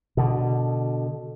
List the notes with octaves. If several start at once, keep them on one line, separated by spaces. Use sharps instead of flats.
B2 D3